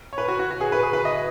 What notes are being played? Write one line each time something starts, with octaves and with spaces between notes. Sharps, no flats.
C#5
B4
F#4
F#4
F#4
G#4
B4
G#4
B4
D#5